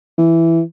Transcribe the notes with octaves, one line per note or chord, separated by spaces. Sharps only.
E3